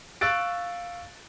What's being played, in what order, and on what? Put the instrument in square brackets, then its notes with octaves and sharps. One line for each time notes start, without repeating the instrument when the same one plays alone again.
[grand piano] F5 C#6 E6 F#6 A6 D7